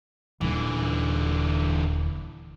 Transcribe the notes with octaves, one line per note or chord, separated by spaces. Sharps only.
D#1 D3 E3